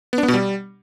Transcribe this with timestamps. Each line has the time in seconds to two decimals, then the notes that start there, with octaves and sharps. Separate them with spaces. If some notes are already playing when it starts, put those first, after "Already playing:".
0.13 B3
0.18 D4
0.23 B3
0.28 B2
0.34 G3